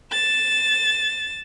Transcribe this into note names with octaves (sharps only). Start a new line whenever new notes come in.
A6 E7